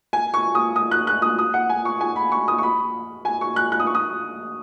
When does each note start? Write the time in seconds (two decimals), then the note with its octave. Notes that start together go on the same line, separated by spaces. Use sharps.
0.13 G#5
0.34 C#6
0.55 D#6
0.76 D#6
0.91 F#6
1.07 F#6
1.22 D#6
1.39 D#6
1.54 F#5
1.69 G#5
1.85 C#6
2.01 G#5
2.16 B5
2.32 C#6
2.48 D#6
2.58 C#6
2.63 B5
3.25 G#5
3.41 C#6
3.56 F#6
3.72 F#6
3.80 D#6
3.87 C#6
3.95 D#6